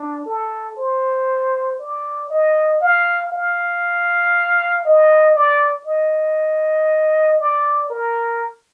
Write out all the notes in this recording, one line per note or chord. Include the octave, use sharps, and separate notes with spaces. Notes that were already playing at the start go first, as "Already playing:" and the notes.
Already playing: D4
A4
C5
D5
D#5
F5
F5
D#5
D5
D#5
D5
A#4